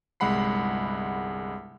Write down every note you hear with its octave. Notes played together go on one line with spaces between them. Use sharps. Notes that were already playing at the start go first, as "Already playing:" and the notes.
G1 C2 G#3 F#5 B5 C7